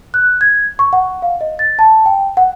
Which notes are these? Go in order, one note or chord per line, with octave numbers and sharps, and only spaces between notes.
F#6
G#6
C#6
F#5
F5
D#5
A6
A5
G5
F#5